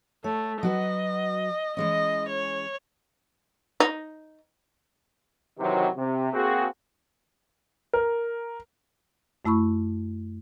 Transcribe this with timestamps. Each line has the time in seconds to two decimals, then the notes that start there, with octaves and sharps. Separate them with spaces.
0.24 A3 C#5
0.63 F#3 F#4 B4 D#5
1.77 E3 G#3 C#4 D#5
2.29 C#5
3.80 D#4
5.59 C3 D#3 E3 F#3
5.96 C3
6.33 A#3 C4 F#4 G#4
7.93 A#4
9.45 F#2 A3 E4 B5 C#6